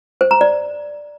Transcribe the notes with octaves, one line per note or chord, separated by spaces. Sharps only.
C5
A#5
D5